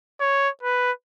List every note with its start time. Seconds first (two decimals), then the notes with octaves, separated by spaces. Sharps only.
0.20 C#5
0.63 B4